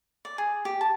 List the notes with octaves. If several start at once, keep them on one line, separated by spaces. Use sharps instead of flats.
D5
G#4
G4
A5